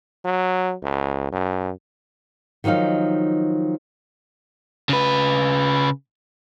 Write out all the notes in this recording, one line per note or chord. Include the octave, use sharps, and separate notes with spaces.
F#3
C#2
F#2
D#3 F3 F#3 D#4 F5
C#3 B4